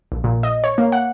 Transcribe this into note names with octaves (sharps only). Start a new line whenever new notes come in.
A#1
A#2
D#5
C#5
A#3
F#5